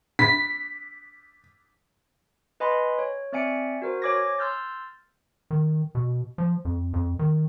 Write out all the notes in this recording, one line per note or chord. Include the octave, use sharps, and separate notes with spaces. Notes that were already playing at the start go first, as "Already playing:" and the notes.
D4 B6
B4 D#5 G#5 B5 C6
C#5
C4 D5 E5 G#5 C#7 D7
F#4 A#4 C5
C#5 G#5 D6 G#6 A#6
C6 E6 F6 G6 A6
D#3
B2
F3
F2
F2
D#3